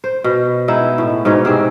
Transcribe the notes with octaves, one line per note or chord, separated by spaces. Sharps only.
C5
B2
G#3 B3 D#4 E4
A2
G#2 B2 D#4 C#5
C3 C4 G#4